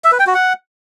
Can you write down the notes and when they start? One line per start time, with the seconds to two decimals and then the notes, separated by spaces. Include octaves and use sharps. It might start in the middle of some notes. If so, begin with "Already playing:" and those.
0.04 E5
0.12 B4
0.19 G5
0.27 F#4
0.34 F#5